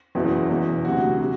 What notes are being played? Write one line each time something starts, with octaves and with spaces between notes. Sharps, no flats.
F#1 E2 B2 F#3 E4
E1 E2 B2
D2 C3 F#3 F#4
C3